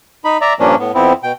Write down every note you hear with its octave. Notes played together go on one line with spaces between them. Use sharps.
D#4 B5
D5 E5 A#5
G2 A#2 F3 A#3 C#4 D4
A2 B3
F2 B3 C4 E4
B2 G5